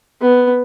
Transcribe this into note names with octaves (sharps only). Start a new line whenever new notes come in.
B3